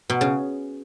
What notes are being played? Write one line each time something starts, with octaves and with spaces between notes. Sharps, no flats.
B2
C#3